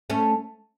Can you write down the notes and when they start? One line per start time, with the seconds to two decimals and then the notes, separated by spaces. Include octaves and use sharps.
0.10 A3 C#4